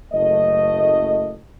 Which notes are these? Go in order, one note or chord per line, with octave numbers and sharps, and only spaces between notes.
F#1 A3 D#5